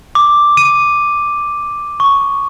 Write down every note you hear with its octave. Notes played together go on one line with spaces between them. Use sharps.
D6
D#7
C#6